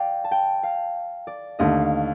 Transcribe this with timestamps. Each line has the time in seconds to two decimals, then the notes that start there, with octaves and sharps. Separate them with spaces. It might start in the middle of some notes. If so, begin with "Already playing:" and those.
Already playing: D5 F5 G5
0.24 A5
0.31 G5
0.63 F5
1.27 D5
1.59 D#2 D3 A3 D#5
1.80 F5